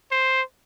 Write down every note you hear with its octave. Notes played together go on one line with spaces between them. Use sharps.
C5